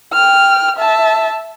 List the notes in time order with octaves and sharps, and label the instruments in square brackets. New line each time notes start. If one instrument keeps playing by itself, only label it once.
[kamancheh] G5 F6
E5 A5